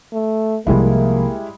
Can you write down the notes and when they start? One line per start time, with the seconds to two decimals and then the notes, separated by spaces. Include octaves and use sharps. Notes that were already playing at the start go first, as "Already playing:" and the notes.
0.13 A3
0.67 C2 F3 G3 G#3 A#3 E4